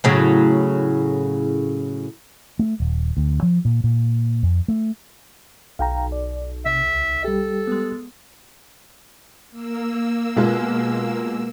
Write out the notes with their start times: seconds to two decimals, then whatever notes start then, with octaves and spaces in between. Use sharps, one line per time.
0.04 A2 C#3 F#3
2.59 A3
2.80 D#1
3.17 D2
3.43 F3
3.65 A#2
3.84 A#2
4.43 F2
4.68 A3
5.79 B1 F5 G5 A#5
6.12 D5
6.66 C3 E5
6.87 C#2
7.24 G3 G4 A4
7.67 G#3 B3
9.51 A#3 E6
10.36 B2 G#3 F4